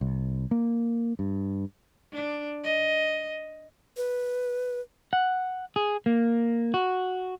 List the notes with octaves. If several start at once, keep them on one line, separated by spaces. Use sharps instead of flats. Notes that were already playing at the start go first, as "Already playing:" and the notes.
C2
A#3
G2
D4
D#5
B4
F#5
G#4
A#3
F#4